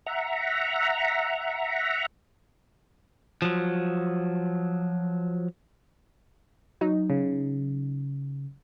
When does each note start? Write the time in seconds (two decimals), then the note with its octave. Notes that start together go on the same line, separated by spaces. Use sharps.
0.06 E5 F#5 A#5
3.42 F3 F#3
6.81 F#3 D#4
7.10 C#3